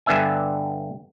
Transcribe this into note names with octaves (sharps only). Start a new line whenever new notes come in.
G2 D3 B3 D4 E5 G#5